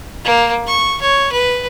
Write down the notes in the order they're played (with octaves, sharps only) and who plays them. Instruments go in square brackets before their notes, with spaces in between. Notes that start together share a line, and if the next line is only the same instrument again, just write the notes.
[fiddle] A#3
C#6
C#5
B4